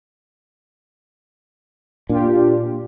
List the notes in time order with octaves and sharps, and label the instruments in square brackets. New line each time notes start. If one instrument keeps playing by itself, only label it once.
[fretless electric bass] A#2 [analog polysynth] D4 F4 G4